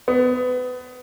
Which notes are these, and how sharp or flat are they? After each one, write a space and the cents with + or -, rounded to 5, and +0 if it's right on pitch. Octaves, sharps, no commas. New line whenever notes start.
B3 +25